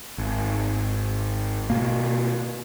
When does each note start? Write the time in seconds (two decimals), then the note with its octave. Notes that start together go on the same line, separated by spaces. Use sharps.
0.18 G#1
1.70 B2 A#3